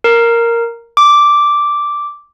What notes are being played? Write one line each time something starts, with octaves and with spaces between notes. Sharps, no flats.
A#4
D6